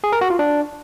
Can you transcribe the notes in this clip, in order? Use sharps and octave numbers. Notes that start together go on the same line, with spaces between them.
G#4
A#4
F#4
F4
D4